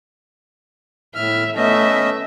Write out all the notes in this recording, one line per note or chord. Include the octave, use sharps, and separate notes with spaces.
A2 E5 F6
A3 B3 C#4 D#5 E5